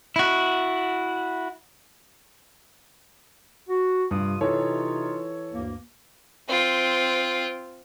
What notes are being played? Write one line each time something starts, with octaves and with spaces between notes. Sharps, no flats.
E4 F#4
F#4
G2 C3 F4 D#6
C3 E3 D#4 F4 A4 C#5
D2 G2 A#3
C4 F4